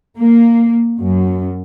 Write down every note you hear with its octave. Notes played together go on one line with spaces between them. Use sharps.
A#3
F#2